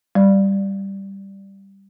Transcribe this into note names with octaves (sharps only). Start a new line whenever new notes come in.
G3 D5